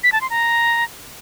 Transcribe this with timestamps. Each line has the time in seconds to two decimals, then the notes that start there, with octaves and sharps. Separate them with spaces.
0.04 B6
0.12 A5
0.21 C6
0.30 A#5